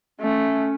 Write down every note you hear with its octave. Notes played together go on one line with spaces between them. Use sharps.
A3 C#4